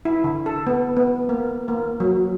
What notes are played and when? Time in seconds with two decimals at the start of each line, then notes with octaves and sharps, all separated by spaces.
0.05 E4
0.24 D3
0.46 A4
0.67 B3
0.97 B3
1.29 A#3
1.68 A#3
2.00 F#3